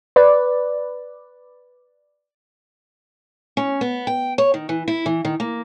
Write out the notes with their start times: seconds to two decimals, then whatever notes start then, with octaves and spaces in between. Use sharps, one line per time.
0.16 B4 D5
3.57 C#4
3.81 B3
4.07 G5
4.38 C#5
4.54 D#3
4.69 E3
4.88 E4
5.06 E3
5.25 D#3
5.40 A#3